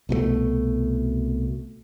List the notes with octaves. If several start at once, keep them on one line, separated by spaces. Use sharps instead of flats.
C2 B2 F3 A3